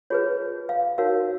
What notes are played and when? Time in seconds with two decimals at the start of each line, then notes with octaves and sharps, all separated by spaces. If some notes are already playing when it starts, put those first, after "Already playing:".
0.10 F4 G#4 B4 C#5
0.69 F5
0.98 D#4 F#4 A#4 C#5 F5